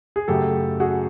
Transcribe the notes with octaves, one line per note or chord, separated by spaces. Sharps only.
G#4
F#2 C#3 F#3 A3 G4 A4
F#4 G#4